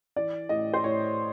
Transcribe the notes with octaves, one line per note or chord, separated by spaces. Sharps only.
E3 D5
A2 D#5
C5
A2 C#5